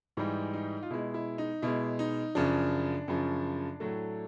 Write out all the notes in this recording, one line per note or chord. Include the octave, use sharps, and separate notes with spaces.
G#2 E3 G3 D#4
D#4
F4
B2 G#3 E4
E4
D#4
B2 G#3 E4
D#4
F#2 C#3 F3 D4
F#2 C#3 F3
A2 F#3 A3